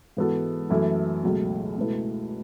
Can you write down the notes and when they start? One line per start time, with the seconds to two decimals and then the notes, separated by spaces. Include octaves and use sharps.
0.17 G#2 E3 B3 F#4 A4
0.70 F#2 E3 A3 E4 A4
1.23 C#2 B2 F#3 A3
1.76 C#2 B2 A3 E4 B4